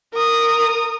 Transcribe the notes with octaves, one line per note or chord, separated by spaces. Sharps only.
A#4 D#6